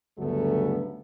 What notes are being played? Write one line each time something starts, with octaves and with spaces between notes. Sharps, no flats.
D2 G2 C#3 F#3 A3 B3